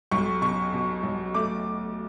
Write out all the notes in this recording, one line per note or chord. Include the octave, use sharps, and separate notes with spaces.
B1 C#6
B2 C#6
B2
B1
A3 D6